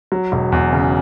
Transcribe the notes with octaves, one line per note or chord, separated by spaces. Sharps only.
F#3
E1
E2
C#3